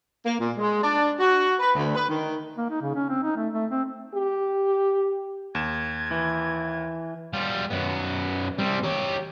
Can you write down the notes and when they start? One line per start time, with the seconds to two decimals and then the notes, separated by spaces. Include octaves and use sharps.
0.25 A#3
0.39 A#2
0.57 G#3
0.83 D4
1.20 F#4
1.60 B4
1.75 D2
1.95 B4
2.08 D#3
2.57 A#3
2.70 D#4
2.82 C#3
2.95 C#4
3.09 C4
3.23 D#4
3.37 A3
3.53 A3
3.70 C4
4.14 G4
5.55 D#2 G#6 E7
6.11 E3
7.33 G3 F4
7.70 F#2 B3
8.58 G3 C4
8.83 G4 C#5